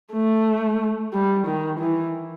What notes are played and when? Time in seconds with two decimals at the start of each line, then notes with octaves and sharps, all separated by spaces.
0.13 A3
1.13 G3
1.47 D#3
1.80 E3